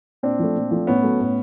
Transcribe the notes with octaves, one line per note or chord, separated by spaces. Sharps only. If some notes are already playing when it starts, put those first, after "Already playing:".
A#2 C4 D4
F3 A3
A#2
F3 A3
A2 B3 C#4
F#3 A3
A2